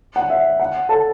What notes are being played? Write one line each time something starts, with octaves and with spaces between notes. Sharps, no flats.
F#5
E5
F#5
A4 A5